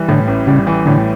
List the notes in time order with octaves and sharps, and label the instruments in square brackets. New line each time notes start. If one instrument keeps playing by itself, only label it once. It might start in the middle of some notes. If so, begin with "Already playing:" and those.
Already playing: [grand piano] E3 G3
[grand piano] A2 [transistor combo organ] D3
[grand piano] A1
[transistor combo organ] C#3 [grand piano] G3
[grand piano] E3
[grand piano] A2 [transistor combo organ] D3